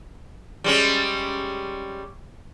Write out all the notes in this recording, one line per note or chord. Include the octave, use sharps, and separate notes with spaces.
G3 G#3 C#4